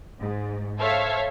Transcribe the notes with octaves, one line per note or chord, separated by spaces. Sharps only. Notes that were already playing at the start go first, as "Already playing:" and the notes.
G#2
A4 C5 C#5 E5 F5